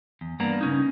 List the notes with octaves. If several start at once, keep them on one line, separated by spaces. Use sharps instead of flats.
E2
G2 A#3 B3 D4 A#5
C#3 C#4 D#4